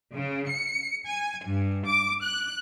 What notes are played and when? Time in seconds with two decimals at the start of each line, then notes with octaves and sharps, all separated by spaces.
0.13 C#3
0.49 C#7
1.08 G#5
1.47 G2
1.86 D6
2.24 F#6